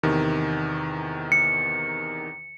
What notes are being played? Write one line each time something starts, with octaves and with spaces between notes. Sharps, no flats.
E2 C3 D#3
C#7